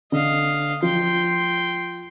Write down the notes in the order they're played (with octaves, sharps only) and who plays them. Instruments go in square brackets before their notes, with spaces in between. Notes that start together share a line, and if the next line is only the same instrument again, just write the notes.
[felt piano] D3 [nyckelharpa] D#5 F5
[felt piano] F3 [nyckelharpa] G5 C6